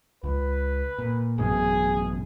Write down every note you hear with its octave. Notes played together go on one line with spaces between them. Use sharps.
C#2 B4
A#2
A1 F#2 B2 G#4